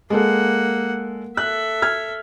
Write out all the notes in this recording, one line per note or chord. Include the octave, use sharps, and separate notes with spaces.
G#3 A#3 A4 F#5
A4 E5 F#6
F6 G#6